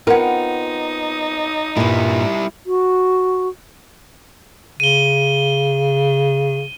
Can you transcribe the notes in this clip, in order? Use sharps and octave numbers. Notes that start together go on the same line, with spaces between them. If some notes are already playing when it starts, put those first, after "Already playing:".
B3 C4 D#4 F4 A#4 F#5
G2 A#2 G3 E4
F#4
C#3 D#7 G7